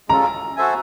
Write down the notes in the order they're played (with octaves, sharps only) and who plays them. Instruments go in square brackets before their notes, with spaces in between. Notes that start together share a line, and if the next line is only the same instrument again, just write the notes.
[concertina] G#3 C#4 F4 A4 [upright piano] A#5
[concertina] F#4 A4 C5 E5 G#5